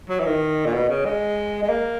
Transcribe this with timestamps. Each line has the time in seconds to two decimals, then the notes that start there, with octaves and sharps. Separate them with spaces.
0.10 F#3
0.20 E3
0.26 D#3
0.66 A#2
0.74 B2
0.89 C#3
1.05 G#3
1.62 G#3
1.69 A#3